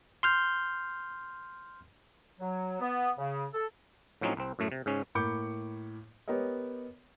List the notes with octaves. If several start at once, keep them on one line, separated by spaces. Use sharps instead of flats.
C6 F6 G6
F#3
B3
C#3
A4
A2 F3 F#3 C4 C#4 D#4
C2 C4
F#2 A2 A3
C3
G#2 C#3 C#4
A2 A#3 B5 D6 G6 C#7
B3 G4 A#4 C#5 D#5